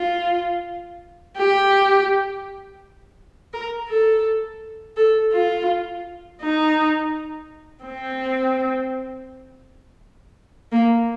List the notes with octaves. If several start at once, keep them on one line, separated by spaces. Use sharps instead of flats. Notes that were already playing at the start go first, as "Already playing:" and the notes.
Already playing: F4
G4
A#4
A4
A4
F4
D#4
C4
A#3